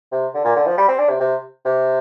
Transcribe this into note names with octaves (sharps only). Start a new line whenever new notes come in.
C3
D3
A#2
D3
F3
G3
C4
D4
C3
C3
C3